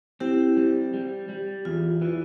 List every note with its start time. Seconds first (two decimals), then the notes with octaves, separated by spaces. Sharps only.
0.20 C4 E4 G4
0.57 G3
0.94 G3
1.29 G3
1.65 E2 F4
2.02 E3